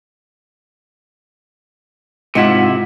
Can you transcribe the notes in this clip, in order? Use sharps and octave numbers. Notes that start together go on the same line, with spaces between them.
G#2 C3 E4 F4 F#5